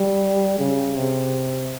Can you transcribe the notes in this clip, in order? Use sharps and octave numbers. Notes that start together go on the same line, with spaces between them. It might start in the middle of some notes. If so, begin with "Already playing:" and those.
Already playing: G3
C#3
C3